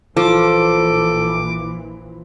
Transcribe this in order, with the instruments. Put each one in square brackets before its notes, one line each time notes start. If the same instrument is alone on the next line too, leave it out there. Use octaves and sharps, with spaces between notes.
[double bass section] A#1 A#2 E3 [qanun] F3 [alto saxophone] A4 [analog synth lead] D6